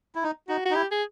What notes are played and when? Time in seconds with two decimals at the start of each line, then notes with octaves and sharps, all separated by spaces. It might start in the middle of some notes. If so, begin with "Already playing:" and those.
0.15 E4
0.23 D#4
0.49 D#4 F#4
0.65 F#4
0.70 D#4
0.74 E4 G4
0.91 G#4